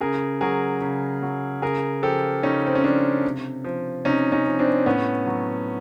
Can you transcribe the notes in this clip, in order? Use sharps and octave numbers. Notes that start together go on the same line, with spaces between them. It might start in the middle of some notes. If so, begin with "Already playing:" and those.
C#3 G#4 A#4
F#3 G#4 A#4
C#3
F#3
C#3 G#4 A#4
F3 G4 A4
C#3 C#4 D#4
C4
C#4
F3 C4 D4
C3
F3
C3 C#4 D#4
C#4 D#4
F3
C4 D4
A2 B3 C#4
F#3